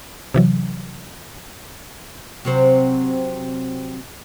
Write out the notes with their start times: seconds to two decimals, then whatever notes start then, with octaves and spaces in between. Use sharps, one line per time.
0.34 C3 E3 F#3
2.45 C3 F#3 C4